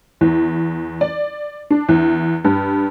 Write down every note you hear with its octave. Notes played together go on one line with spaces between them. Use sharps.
E2
D5
D4
E2
G2